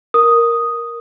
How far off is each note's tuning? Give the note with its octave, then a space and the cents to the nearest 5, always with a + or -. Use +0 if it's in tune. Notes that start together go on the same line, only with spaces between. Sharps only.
A#4 +0 D#6 +0